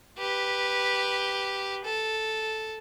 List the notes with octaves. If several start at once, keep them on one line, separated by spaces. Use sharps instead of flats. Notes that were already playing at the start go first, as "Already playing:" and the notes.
G4 B4
A4